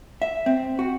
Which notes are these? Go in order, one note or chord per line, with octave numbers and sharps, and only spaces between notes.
E5
C4
F#4